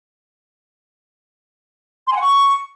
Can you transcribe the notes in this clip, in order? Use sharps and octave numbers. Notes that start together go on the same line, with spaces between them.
C6
G#5
F#5
C#6